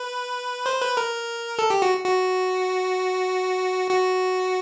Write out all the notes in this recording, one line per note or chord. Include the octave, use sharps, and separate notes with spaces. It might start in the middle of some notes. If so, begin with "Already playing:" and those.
Already playing: B4
C5
B4
A#4
A4
G4
F#4
F#4
F#4